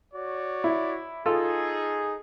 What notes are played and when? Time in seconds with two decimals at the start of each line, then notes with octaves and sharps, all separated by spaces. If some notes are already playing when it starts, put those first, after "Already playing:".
0.14 F#4 C#5 D5
0.64 E4
1.26 D#4 F4 G#4 A4